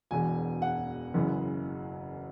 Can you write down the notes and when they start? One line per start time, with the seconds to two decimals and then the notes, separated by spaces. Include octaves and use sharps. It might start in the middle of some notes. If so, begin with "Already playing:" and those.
0.11 E1 E2 B2 G#5
0.62 F#5
1.14 F#1 F#2 C#3 E3